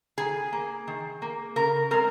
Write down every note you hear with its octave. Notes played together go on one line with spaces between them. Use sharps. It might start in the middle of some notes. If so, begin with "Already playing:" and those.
D#3 G#4
A#3
D#3
A#3
C#3 A#4
G#3 C4 A#4